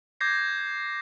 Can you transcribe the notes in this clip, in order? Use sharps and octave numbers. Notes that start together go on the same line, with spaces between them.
D6 G6 G#6 A#6 C7